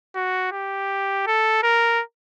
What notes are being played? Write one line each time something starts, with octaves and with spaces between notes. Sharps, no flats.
F#4
G4
A4
A#4